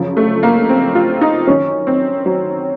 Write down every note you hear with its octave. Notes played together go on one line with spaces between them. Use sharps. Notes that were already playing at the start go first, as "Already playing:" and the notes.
Already playing: F#2 C#3 F3
A3
A#3
C4
F4
D#4
F#2 D#3 C#4
C4
F#3